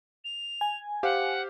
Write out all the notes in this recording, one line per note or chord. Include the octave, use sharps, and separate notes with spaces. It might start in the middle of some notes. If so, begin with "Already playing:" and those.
F7
G#5
G4 C5 F5 F#5